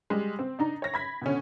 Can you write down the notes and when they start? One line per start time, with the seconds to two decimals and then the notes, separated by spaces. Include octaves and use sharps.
0.10 G3 G#3
0.39 C4
0.59 D4 D#4 A#5
0.82 C#5 A#6
0.94 B5 G#6 B6
1.22 B2 D3 C#4